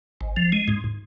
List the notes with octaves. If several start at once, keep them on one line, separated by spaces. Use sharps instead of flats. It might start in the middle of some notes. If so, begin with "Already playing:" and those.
G#1
F3
G#3
G#2